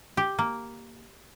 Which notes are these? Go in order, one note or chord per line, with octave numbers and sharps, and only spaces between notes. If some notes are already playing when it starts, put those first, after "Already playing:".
G4
A#3